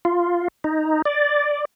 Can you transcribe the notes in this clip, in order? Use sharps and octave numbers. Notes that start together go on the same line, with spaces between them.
F4
D#4
D5